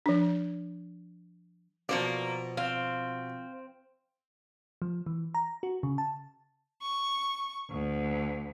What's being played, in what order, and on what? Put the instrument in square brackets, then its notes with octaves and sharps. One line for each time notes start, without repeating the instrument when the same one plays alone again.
[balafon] F3 D4
[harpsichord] B2 B3 [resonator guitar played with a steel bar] F3 C5 D5 [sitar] A#3
[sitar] C4 [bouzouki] F5
[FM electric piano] F3
E3
A#5
F#4
C#3
A5
[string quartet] C#6
D2